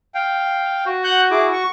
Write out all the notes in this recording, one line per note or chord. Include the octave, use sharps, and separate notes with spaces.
F5 G5
F#4
F#5 F#6 G6
E4 G#4 D6
C#6